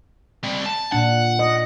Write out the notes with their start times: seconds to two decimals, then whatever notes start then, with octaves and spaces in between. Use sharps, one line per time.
0.44 G3 C4
0.66 A5
0.92 A#2 D4 F#5
1.39 D#5